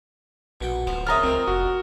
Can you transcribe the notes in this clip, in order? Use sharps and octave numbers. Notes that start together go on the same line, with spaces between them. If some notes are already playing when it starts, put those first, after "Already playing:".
A#1 B2 F#4 G5
D1 F3 B3 C5
C#3 A#3 C4 F4 D#5 E5 A#5 F6
C#2 A#3 C4 A#4
F1 F#4